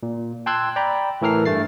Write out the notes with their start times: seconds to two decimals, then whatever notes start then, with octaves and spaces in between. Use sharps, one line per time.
0.03 A#2
0.46 G5 A5 C6 E6 F#6 G#6
0.76 D5 G5 A#5 B5
1.21 A2 E3 A4 A#4 F6 C7
1.45 G2 A3 A6 C7